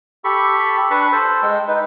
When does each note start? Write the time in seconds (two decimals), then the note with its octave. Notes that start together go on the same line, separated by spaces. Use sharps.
0.24 G4 A4 B5 C#6
0.91 D4 B4 A5 B5 C#6
1.12 A4 C5
1.42 G#3 G5
1.68 D#4 B4